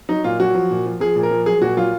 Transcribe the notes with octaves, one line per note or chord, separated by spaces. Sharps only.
F#3 D#4
A#2 F4
F#3 F#4
F3
A#2
F3
F3 G#4
A#2
A#4
F3
F#3 G#4
A#2 F#4
F#3 F4